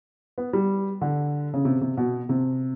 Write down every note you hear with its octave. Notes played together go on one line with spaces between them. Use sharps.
B3
G3
D3
C#3
C3
C3
B2
C3